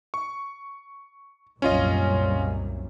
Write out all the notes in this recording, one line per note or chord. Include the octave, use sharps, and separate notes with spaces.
C#6
C2 F#2 A#2 C#4 F4 D#5